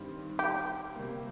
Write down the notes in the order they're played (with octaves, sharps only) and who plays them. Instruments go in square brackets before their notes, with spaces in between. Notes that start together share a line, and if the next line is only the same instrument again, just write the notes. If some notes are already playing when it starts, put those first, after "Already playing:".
Already playing: [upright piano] G2 D#3 G3 C4
[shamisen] G4
[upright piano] C3 G3 A#3